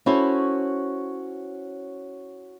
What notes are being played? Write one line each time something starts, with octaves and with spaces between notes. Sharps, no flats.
C#4 E4 F#4 A4 C5 C#5